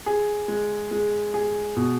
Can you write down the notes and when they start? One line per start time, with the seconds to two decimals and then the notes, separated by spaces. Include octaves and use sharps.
0.06 G#4
0.48 G#3
0.91 G#3
1.34 G#4
1.77 B2